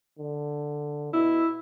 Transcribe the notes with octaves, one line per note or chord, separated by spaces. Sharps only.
D3
B2 E4